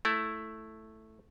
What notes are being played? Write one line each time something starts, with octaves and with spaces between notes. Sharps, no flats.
A3 E4